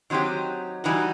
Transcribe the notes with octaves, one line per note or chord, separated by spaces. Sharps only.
D#3 F#3 C4 D#4 G4
E3 G3 D#4 F#4